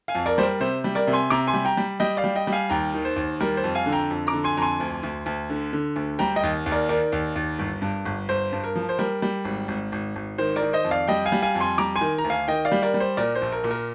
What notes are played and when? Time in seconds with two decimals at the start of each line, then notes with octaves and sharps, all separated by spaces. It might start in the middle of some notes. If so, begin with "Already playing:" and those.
0.08 F5 G#5
0.15 F2
0.26 A#4 D5
0.38 G3 C5
0.43 A#4
0.60 C3 C5
0.84 G3
0.95 A#4 D5
1.07 C3
1.13 G#5 C6
1.30 C3 A#5 D6
1.47 G#5 C6
1.54 G3
1.65 G5 A#5
1.77 G3
2.00 G3 D#5 G5
2.17 D5 F5
2.24 G3
2.36 D#5 G5
2.47 G3
2.53 F5 G#5
2.70 D#2 G5 A#5
2.94 D#3
3.05 C5
3.16 D#2
3.41 G3 A#4
3.57 C5
3.64 F2
3.75 F5 G#5
3.86 D3
3.92 G5 A#5
4.10 F2
4.27 A#5 D6
4.33 D3
4.44 G#5 C6
4.57 F2 A#5
4.62 G#5 C6
4.80 D2
5.03 D2
5.26 D2
5.50 D3
5.73 D3
5.96 D2
6.19 G3 G5 A#5
6.36 D#5 G5
6.43 D#2
6.66 D#2
6.72 A#4 D5
6.89 D#3 A#4 D5
7.12 D#2
7.35 D#2
7.59 G1
7.82 G2
8.05 G1
8.29 G1 C5
8.53 G2
8.64 A#4
8.75 F3
8.89 C5
8.99 G3 A#4
9.22 G3
9.45 G#1
9.68 G#1
9.92 G#1
10.16 G#1
10.38 D#3 C5
10.56 A#4 D5
10.62 D#3
10.73 C5 D#5
10.84 F2
10.91 D5 F5
11.08 G3 D#5 G5
11.26 F5 G#5
11.32 G3
11.43 F5 G#5
11.55 F2
11.60 G#5 C6
11.78 G3 A#5 D6
11.96 G#5 C6
12.01 D#3
12.18 A#5
12.24 D2
12.30 F5 G#5
12.48 D#3 D#5 G5
12.65 D5 F5
12.72 G3
12.82 A#4 D5
12.94 G3
13.00 C5
13.17 A#2 A#4 D5
13.35 C5
13.41 A#1
13.52 A#4
13.64 A#2
13.71 A#4